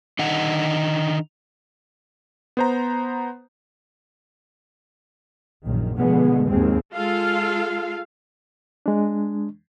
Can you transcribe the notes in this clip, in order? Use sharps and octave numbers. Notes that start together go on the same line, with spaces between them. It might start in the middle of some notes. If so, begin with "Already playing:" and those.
D3 D#3 D#4 F#5
B3 C5 A#5
A#1 F#2 D#3
B2 D3 F3 G#3 B3
D#2 G#2 G#3 C4
G#3 F4 A4 F5
G#3 D4